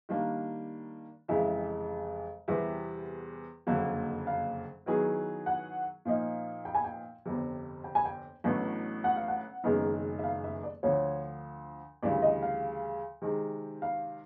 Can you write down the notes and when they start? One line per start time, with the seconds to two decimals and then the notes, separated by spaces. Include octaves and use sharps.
0.09 D#3 G3 A#3 D4
1.28 F1 F2 C#3 E3 G#3 E5
2.48 E2 C3 E3 G3 B3 E5
3.67 F#1 F2 D3 F#3 A#3
4.27 F5
4.86 D#3 F#3 B3 E4 G#4
5.46 F#5
6.05 A#2 F3 A#3 D#4
6.65 G5
6.75 G#5
6.84 G5
7.25 G1 F2 C3
7.84 G5
7.95 G#5
8.05 G5
8.44 A1 A2 F#3 B3 D4
9.04 F#5
9.16 F5
9.28 F#5
9.64 F#1 F#2 D#3 G#3 B3
10.19 E5
10.24 F5
10.44 E5
10.63 D5
10.83 D2 D3 F3 C#5
12.03 D2 C#3 E3 G3 D5
12.22 D#5
12.43 F5
13.22 C3 D#3 G#3
13.82 F5